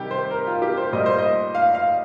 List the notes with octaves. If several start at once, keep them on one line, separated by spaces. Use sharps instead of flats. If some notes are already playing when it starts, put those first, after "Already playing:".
Already playing: C3 D#3 G3 G4
C5
A#4
F4
G4
C5
A#2 G3 D#5
C5
D#5
F5
F5